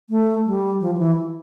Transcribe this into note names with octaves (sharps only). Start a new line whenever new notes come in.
A3
G3
F3
F3
E3